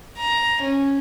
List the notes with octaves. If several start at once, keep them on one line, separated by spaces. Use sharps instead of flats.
A#5
C#4